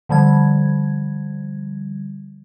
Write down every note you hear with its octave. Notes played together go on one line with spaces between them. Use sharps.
D3 F3 G3 G#6